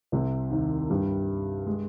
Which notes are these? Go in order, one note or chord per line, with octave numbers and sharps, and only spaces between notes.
C2 C3
D#2 D#3
G2 G3
G#3